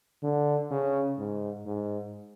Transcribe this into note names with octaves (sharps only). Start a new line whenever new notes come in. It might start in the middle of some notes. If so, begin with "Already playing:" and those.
D3
C#3
G#2
G#2